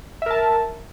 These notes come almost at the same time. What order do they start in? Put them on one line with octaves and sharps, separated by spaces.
E5 A#4 A5